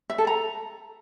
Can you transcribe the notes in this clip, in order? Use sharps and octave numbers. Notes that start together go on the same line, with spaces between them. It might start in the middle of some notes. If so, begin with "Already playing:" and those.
E5
A4
A#5